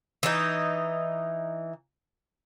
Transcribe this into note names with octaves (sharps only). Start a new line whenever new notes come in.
E3 D#4